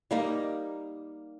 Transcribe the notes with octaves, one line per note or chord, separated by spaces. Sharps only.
G3 A#3 D#4